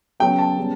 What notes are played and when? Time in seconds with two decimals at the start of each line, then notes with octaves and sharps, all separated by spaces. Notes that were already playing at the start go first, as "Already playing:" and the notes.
0.20 C#3 F#3 B3 G5
0.39 A5
0.58 C#3 G3 B3